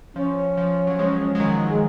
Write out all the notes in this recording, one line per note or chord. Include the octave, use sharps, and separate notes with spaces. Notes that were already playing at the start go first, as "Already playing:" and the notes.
F3 C#4
F3
F#3
F3 G#3
G#3
D#3 F#3
G#3